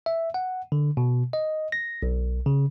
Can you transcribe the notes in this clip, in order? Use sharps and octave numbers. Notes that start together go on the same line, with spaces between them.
E5
F#5
D3
B2
D#5
A#6
B1
C#3